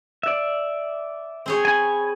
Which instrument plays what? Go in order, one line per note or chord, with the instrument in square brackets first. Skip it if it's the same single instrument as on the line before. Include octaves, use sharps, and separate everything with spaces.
[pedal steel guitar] D5 E5
[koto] C4 G#4 C#5
[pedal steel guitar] G#5 B5